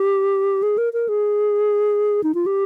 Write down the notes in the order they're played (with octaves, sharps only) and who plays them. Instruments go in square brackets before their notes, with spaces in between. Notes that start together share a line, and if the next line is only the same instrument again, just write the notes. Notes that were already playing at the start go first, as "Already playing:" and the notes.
Already playing: [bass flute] G4
G#4
A#4
A#4
G#4
D#4
F4
G4